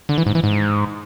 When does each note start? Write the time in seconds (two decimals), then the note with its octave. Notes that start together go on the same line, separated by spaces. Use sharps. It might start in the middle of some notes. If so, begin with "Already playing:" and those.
0.09 D3
0.18 E3
0.26 G#2
0.35 E3
0.44 G#2